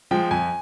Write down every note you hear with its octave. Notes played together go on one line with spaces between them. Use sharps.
F3 G#3 G5
F2 G#5